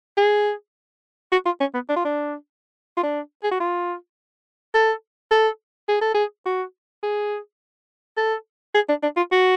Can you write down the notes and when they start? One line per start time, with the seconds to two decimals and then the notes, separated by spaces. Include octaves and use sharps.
0.17 G#4
1.32 F#4
1.45 F4
1.60 C#4
1.74 B3
1.89 D4
1.96 F4
2.05 D4
2.97 F4
3.03 D4
3.44 G#4
3.51 F#4
3.60 F4
4.74 A4
5.31 A4
5.89 G#4
6.01 A4
6.15 G#4
6.46 F#4
7.03 G#4
8.17 A4
8.74 G#4
8.89 D4
9.03 D4
9.16 F4
9.32 F#4